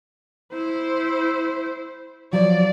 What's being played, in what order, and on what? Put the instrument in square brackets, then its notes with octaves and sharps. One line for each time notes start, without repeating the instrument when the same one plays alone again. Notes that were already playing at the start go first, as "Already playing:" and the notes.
[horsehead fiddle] E4 C5
[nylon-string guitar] F3 F#3 [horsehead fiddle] D5